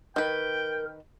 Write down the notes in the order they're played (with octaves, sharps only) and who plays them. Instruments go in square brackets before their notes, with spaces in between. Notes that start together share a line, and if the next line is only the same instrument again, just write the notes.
[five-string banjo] D#3 B4 [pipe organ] A#4 [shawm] G5